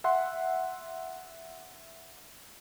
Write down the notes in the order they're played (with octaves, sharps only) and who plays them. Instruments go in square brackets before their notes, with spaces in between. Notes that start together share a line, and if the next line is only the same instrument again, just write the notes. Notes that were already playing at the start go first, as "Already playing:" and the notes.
[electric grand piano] E5 F#5 C6